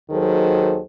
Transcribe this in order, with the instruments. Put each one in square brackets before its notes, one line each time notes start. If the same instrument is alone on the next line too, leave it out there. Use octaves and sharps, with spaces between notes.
[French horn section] D#2 D#3 F#3 G#4 A4 C5